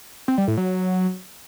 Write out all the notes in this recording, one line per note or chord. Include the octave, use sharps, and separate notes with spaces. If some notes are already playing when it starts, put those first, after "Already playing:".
C4
G3
A2
F#3